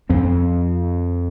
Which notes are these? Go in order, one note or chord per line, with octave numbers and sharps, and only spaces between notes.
F2 F3 C4